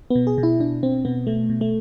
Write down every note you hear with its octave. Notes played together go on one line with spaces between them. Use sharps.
B2 B3
G#4
B2
E4
B2 D4
B2 C4
B2 B3
B2 A3
B2
A3